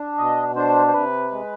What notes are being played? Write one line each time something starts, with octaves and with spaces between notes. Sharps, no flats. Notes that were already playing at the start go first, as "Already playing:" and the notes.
Already playing: D4
B2 D#5
D4 C5
C5
C3 B4
G#3